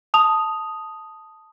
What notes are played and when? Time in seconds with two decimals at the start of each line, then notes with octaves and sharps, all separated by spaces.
0.14 A5 D#6 F7